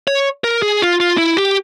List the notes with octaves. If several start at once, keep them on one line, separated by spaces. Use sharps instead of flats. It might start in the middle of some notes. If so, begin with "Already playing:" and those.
C#5
A#4
G#4
F4
F4
E4
G4